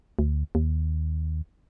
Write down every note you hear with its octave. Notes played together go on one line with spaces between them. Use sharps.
D2
D#2